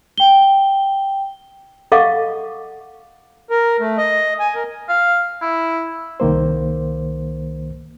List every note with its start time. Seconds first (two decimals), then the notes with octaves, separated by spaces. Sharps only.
0.18 G5 G7
1.92 A4 D#5 F5 F#5 C#6 D6
3.50 A#4
3.80 A3
3.98 D#5
4.39 G#5
4.55 A#4
4.89 F5
5.42 E4
6.20 C2 D#3 A#3 C5